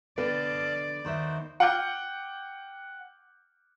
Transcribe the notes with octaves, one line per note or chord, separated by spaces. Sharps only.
D3 B3 D5 D#5 F5 G5 A5
D#2 D#3 D#4 F#4 C5 E5
F#5 G5 D6 F6 G6 C#7